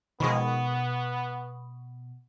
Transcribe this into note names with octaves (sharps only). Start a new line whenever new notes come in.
B2 D#3 F3 G#3 B3 B5 C#6 D#6